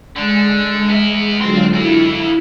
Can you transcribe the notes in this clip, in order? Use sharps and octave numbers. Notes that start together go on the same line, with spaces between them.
D3 G#3
B3 E5
D3 F#3 C4 F4 C6
C4 E4 A4